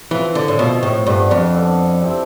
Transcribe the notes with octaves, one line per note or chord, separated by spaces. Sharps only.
E3 F3 C4 E4
D3
A2
B2 F3 C4 E4
A2
G2 B3 D4 A4 C5
F2
B3 D4 A4 C5
G3 C4 E4